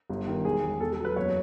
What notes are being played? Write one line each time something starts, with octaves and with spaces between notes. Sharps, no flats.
G1
D#3
E1 G#4
E1
E1 A4
A4
F#3
B4
F#1 C#5